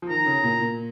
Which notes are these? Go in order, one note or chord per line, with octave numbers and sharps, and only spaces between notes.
F3
D#3 A#5
C#3
A#2
A#2